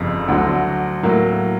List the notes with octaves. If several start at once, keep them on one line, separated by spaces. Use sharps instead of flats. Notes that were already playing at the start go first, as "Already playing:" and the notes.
Already playing: G1 F2 C#3
D2 D3 F#3
A2 F#3 A#3